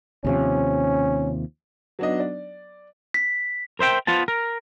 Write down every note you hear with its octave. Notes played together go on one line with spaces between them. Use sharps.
D#2 C3 F3 C#4
F#3 B3 D4 D#4 D#5
D5
B6
A#4 C5 E5 G5
B3 F4 C5 A5
A#4